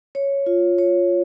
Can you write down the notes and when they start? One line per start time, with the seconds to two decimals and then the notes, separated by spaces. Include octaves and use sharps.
0.15 C#5
0.46 F4
0.78 C#5